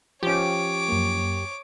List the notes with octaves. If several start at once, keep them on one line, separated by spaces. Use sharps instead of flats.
F3 C#4 G4 C#5 D6
F#2 A#3